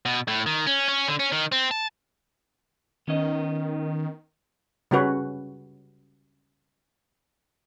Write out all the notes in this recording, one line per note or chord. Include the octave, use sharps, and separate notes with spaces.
B2
A2
D#3
C#4
C#4
D3
C#4
D#3
C4
A5
D#3 B3 C#4 D#5
C#3 G3 C#4 F#4 B4 C#5